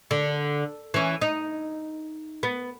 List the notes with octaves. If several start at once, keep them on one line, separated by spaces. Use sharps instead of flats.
D3
E3 C#4
D#4
B3